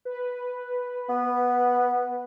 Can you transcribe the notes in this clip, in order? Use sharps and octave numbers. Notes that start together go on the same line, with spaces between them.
B4
B3